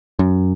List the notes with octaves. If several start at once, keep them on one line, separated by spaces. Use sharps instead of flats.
F#2